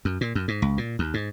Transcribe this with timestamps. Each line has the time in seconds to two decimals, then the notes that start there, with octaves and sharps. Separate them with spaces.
0.05 F#2
0.21 A#2
0.35 F#2
0.48 G#2
0.62 C#2
0.78 A#2
0.99 D#2
1.14 G#2